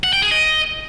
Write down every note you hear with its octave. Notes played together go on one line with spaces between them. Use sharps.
F#5
G5
G#4
D#5